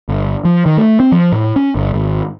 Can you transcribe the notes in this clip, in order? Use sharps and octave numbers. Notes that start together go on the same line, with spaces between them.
G1
F3
D#3
A3
C4
F3
A2
C#4
G1
G#1